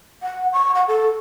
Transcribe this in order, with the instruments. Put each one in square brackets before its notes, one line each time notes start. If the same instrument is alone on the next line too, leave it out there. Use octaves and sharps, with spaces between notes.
[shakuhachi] F#5
C#6
F#5
A4